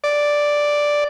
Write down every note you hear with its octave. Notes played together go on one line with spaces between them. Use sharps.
D5